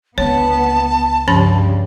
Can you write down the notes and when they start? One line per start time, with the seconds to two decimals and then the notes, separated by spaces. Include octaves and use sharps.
0.18 C#2 D3 B3 C#5 A5
1.28 G2 C#3 F3 G3 C#4 B5